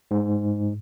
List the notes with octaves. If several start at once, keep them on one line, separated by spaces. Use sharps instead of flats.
G#2